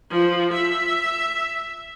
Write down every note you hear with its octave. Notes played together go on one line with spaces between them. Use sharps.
F3
E5